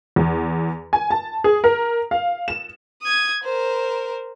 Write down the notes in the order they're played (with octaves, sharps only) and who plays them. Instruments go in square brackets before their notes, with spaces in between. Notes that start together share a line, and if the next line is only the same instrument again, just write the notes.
[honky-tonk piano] E2
G#5
A5
G#4
A#4
F5
E7
[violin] D#6 G#6
A#4 C5